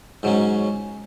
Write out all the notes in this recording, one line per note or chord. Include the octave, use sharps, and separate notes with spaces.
G#2 F#3 C#4